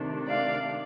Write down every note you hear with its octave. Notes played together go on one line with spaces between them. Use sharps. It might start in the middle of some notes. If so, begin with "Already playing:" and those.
Already playing: C3 D#3 A3 D4
D5 F5